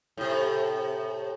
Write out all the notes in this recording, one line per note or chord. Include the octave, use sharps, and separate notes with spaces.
A2 C3